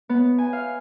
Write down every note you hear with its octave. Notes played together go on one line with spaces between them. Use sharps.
B3
G#5
F5